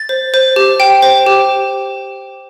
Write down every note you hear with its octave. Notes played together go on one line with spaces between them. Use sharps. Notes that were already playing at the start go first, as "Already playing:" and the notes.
Already playing: A6
C5
C5
G4
G5
C5
G4